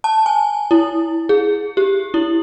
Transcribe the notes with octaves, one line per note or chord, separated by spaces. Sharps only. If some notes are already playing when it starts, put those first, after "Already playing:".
A5
G#5
E4
G#4
G4
E4